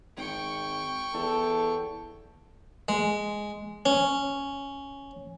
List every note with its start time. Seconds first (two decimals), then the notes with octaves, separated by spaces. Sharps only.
0.17 G#1 G5 C#6
1.14 E2 A4
2.89 G#3
3.86 C#4